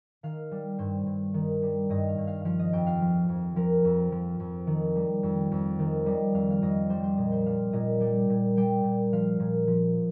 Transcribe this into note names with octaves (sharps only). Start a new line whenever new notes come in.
D#3 F5
G3
G2 C5
G2
D#3
G3
G2 D#5
F5
G2
F5
F3 F5
D#5
F2 G5
F5
F3
F2
F3 A#4
F2
F3
F2
D#3
G3
F2
F2
D#3 C5
G3 D#5
F2 F5
F5
F2 D#5
G3 C5
C5
A#2 D#5
C5
G3 F5
A#2 D#5
G3 G5
A#2
G3 G5
A#2
F3 F5
A#2
F3